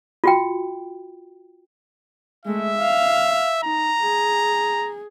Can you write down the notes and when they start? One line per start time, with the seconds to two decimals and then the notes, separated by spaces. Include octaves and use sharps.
0.24 F4 F#4 G5
2.46 G#3 A3 E5
2.78 F5
3.63 D#4 A#5
4.01 G#4